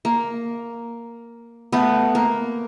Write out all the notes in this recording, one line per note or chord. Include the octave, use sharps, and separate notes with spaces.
A#3
A3 B3
A#3